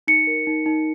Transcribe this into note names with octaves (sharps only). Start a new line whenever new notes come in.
D#4 C#7
A#4
D#4
D#4